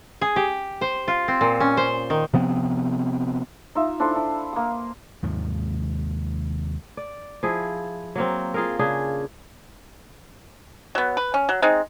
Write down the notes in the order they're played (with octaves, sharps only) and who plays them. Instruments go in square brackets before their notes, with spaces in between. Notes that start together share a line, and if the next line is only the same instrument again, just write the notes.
[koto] G#4
G4
C5
F4
C4
A#2
C#4
C5
D#3
[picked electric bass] C3 F3 B3 C4
[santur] D#4 F4 E5
D4 E4 A4 C5
D4
A#3 D#6
[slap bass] D#2 G#2 C3 F3
[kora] D5
F3 E4 G#4
F#3 A#3 C4
F4 G#4 A#4
C#3 D4 G#4
[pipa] F#3 B3
B4
C#4
F#3
G#3 C4 D#4